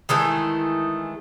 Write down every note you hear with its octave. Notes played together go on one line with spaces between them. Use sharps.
D#3 E3 G#3 A3